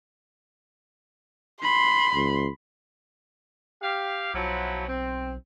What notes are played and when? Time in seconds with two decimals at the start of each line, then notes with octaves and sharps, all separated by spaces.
1.63 B5 C6
2.14 C#2
3.82 G4 F5
4.34 B1 F3 F#3 E4
4.88 C4